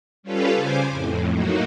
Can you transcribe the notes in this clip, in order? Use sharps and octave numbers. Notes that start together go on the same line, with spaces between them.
G3 C#4 F4 A4 B4 F5
C#3 C5 G#5 D6
F2 A2
A2 F#3 A#3 D#4 F#4